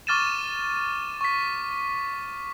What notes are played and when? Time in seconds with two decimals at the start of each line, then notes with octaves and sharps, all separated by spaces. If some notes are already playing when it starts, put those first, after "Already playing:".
0.07 C#6 D6 F6 A6 D#7 E7
1.21 C#6 B6